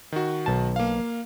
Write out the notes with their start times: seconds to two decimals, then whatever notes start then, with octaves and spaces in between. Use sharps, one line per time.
0.12 D#3 F#4
0.46 B1 A5
0.76 A#3 F5